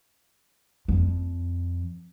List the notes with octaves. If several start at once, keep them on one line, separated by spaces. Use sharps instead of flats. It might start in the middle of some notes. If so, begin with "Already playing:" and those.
F2